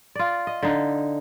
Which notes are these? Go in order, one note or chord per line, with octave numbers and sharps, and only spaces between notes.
F4 D5
D#5
D3 D#4